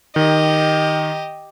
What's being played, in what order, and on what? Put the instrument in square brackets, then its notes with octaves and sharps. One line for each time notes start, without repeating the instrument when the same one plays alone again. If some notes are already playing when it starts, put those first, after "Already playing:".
[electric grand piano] D#3 [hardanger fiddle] G4 D#5